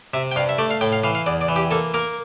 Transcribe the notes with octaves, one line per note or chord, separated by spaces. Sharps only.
C3 E5
G5
G2 F5
E5
A3 D5
F5
A2 G5
F5
E3 F5
F5
E2 D5
D5
E3
G4
A#3 A4
A#3 A#4